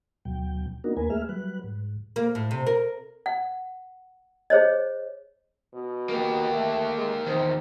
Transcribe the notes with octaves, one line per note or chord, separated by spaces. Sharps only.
D2 B2 F#3 G5
A#3 B3 D4 D#4 F#4 A#4
D#2 A#3 A#4 B4 G#5
A3 A#3 G#4 E5 F6
F#3 G3 B4 F#6
G#2
A#3
A2
C3
A#4
F#5
G#4 C5 C#5 D#5
B2
A#3 G4
A3
G#3
E2 D#3 C4